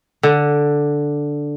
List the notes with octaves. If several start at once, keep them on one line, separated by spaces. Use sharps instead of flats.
D3